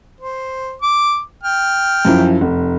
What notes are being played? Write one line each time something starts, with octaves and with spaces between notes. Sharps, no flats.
C5
D6
G5 F6
F#2 F3 E4
F1